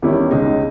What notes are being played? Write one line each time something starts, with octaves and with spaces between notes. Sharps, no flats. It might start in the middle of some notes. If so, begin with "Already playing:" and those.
E2 D#3 G3 C#4 E4
C#2 C#3 G#3 D#4